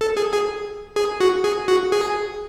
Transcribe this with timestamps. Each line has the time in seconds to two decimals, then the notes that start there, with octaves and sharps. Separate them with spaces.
0.01 A4
0.17 G#4
0.33 G#4
0.96 G#4
1.20 F#4
1.44 G#4
1.68 F#4
1.92 G#4